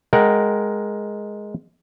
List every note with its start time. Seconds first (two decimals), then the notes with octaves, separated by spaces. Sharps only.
0.13 G#3 A#4 F#5 G5